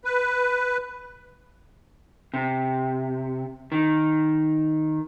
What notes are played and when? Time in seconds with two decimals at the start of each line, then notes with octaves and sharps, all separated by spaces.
0.04 B4
2.34 C3
3.72 D#3